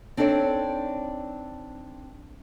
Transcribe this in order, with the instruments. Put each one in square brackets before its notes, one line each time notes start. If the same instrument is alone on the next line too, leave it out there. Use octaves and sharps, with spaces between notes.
[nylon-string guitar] C4 D4 D#4 A4 C#5 D5